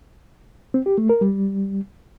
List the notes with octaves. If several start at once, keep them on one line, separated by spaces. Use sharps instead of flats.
C4
G4
A3
A#4
G3